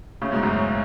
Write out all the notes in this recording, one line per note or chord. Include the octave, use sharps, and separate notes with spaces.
A2 C#3
G#2 B2
F#2 A2